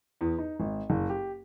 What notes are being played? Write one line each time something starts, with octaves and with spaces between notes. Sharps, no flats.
E2
D#4
G#1
F#1
G4